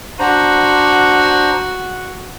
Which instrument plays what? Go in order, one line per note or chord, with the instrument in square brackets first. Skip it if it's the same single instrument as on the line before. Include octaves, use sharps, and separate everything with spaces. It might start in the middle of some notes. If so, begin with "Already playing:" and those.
[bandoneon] D4 C5 A#5 [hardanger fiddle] F#4